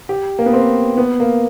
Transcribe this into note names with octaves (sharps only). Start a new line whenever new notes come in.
G4
A#3
B3
C4
B3
A#3